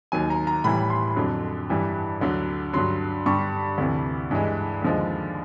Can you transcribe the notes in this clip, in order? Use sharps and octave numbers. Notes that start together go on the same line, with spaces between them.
D#2 D#3 F#3 G#5
A#5
A#5
A2 E3 G3 B5
C6
F2 D3 F#3
G2 E3 G3
D2 D3 F#3
G2 D3 F#3 C6
G2 D3 G3 C#6
D2 C3 E3
G2 E3 G#3
D#2 D3 F3 G#3